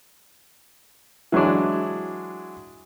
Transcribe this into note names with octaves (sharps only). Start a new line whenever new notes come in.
E3 F#3 G#3 D4